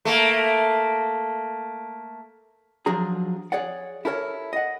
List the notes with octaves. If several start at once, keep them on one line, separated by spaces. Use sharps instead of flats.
A3 A#3
F3 F#3 D4 G#4 A#5
G#4 C#5 D5 F#5
E4 G4 A4 A#4 C#5
D#5 F#5